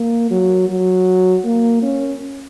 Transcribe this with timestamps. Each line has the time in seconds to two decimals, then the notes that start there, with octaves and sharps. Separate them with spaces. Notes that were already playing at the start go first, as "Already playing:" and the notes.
Already playing: A#3
0.31 F#3
0.69 F#3
1.45 A#3
1.82 C#4